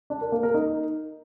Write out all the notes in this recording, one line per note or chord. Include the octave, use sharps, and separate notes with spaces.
D4
A#4
A#3
A#4
D#4